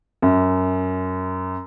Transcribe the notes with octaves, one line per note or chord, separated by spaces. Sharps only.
F#2